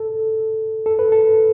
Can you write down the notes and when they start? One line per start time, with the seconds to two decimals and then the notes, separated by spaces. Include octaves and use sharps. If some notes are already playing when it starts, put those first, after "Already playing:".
Already playing: A4
0.86 A4
0.99 B4
1.12 A4